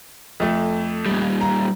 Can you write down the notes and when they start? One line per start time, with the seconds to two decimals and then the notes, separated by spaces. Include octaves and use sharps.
0.40 F2 A3
1.06 A#2 G3
1.41 A#5